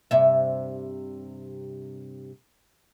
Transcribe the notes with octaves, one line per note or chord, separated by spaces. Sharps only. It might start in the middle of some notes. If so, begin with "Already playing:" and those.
G2 C3 E5